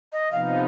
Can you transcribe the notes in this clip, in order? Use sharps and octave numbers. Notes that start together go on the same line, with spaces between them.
D#5
C3 F3 B3 D#4 F5